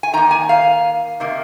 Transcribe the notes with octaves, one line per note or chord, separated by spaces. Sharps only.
G#5
D#3 A#3 A#5
G#5
F5
C3 D#3 A#3